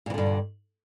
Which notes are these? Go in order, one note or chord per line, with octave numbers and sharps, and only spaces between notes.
G2 A#2 D3 E3